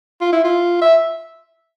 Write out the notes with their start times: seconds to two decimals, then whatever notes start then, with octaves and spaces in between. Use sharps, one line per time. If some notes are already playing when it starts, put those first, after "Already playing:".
0.21 F4
0.32 E4
0.44 F4
0.82 E5